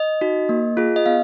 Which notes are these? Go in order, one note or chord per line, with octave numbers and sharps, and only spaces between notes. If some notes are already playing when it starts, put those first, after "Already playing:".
Already playing: D#5
D#4 F#4
A#3
F4 G#4
D#5
B3 F5